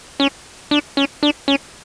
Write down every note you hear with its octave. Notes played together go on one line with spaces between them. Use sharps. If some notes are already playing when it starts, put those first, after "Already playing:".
C#4
D4
C#4
D4
C#4